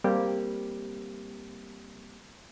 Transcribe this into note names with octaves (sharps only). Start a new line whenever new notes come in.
G3 A#3 C4 G4